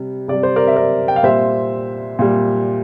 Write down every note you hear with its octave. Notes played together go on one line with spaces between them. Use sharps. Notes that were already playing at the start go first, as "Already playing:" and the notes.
Already playing: C3 G3
C3 G3 D5
C5
A#4 D5
E5
A#4 D5
G5
F5
A#2 G3 C5 E5
A#2 G3